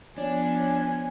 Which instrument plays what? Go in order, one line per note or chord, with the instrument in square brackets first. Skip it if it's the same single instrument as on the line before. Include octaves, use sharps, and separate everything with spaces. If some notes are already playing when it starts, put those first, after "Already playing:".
[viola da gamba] F3 B3 [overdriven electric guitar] D4 [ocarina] C#5 [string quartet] G#5